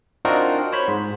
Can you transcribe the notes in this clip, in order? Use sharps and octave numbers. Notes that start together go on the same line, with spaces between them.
C4 D4 D#4 F4 F#4 A#4
C5 C#5 B5
G#2